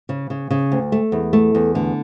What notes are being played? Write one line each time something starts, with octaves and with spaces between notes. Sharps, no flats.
C#3
C#3
C#3
D2
A3
E2
A3
E2
D3